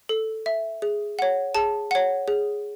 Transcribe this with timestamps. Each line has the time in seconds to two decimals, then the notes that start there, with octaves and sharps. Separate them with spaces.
0.09 A4
0.46 E5
0.82 G#4
1.19 C#5 F#5
1.55 G#4 A5
1.91 C#5 F#5
2.28 G#4